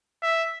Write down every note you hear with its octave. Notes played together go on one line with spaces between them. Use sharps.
E5